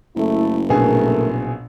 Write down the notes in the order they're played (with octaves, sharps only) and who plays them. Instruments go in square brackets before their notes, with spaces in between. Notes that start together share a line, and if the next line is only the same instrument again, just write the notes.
[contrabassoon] F#1 [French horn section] A3 E4
[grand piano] A#1 B2 G#4 [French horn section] A3 A#4